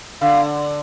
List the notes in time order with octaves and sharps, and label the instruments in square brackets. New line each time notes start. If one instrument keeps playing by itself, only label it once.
[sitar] D3 [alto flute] F5